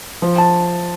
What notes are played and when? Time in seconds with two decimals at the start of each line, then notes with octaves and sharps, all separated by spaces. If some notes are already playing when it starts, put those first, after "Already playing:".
0.22 F3
0.38 A5